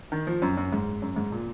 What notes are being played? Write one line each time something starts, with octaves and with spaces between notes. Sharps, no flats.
D#3
F3
F#2
F#2
G#2
F#2
G#2
A#2